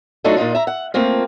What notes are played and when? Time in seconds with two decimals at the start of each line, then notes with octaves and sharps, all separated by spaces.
0.24 F#3 A3 D4 D#4 F4 A4
0.37 A#2 D4 D#4 F4
0.55 E5 A#5
0.67 F#5
0.94 A3 A#3 C4 F4